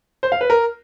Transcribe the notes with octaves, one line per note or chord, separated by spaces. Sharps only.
C5
F5
B4
A#4